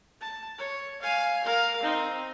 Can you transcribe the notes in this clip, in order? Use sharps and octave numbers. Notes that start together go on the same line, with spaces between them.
A5
C#5
F5 G#5
A#4 F5
C4 D#4